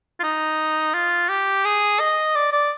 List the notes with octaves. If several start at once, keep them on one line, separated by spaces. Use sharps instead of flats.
F4
D#4
F4
G4
G#4
D#5
D5
D5